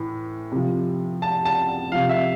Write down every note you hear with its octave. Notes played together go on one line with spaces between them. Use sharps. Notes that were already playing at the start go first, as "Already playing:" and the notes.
Already playing: A2 E3
C3 F3
A5
A5
C3 F3 F5
E5